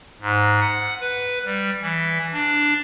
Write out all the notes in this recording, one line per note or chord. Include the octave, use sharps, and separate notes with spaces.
G#2
F#5
B4
G3
E3
D4